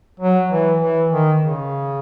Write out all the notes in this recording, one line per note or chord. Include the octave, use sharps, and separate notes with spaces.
F#3
E3
E3
D#3
C#3